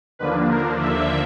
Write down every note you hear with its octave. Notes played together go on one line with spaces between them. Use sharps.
D#2 D3 F3 A#3 D4 B4
A#4
E5